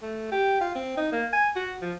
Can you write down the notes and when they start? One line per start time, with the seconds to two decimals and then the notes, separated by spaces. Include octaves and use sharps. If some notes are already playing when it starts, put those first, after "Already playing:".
0.02 A3
0.32 G4
0.61 F4
0.75 C4
0.97 D#4
1.12 A#3
1.33 G#5
1.56 F#4
1.82 F3